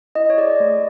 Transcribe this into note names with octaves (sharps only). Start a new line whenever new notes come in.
E4 D#5
C#5
G#4 D5
A3